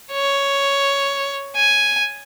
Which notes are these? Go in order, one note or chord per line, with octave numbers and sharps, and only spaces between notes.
C#5
G#5